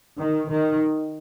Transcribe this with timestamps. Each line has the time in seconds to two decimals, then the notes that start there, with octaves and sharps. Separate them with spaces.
0.20 D#3
0.50 D#3